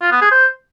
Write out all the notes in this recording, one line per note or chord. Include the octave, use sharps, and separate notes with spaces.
F4
B3
G#4
C5